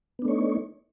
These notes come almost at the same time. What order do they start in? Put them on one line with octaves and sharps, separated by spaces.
B3 D4 A3 C#5 D#4